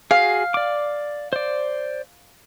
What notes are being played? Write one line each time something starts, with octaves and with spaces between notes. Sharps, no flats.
F#4 G#4 F5
D5 D6
C5 D5